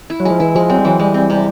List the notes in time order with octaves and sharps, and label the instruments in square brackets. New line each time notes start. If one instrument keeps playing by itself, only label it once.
[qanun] E4
[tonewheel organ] F#3
[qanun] G#3
[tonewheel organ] F3
[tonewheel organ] E3 [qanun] E4
[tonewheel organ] F3 [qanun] G#3
[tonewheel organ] F#3 [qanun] C4
[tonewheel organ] G3
[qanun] E3 [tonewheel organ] F#3
[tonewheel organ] G3 [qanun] G#3
[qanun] C4
C3